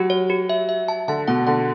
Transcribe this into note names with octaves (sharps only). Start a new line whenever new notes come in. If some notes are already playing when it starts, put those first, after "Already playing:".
Already playing: F#3 G4
C#5
G4
E5
E5
A5
D3 A5
B2 F#5
D3 F#5